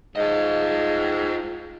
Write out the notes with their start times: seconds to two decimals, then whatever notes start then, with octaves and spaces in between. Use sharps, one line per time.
0.16 G#2 F4 D#5